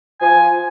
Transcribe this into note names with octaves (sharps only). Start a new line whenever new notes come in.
F3 G#5